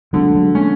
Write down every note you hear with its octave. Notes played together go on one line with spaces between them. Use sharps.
D3 F#3 G#3
A3
F#3 G#3
G#3 A#3 C#4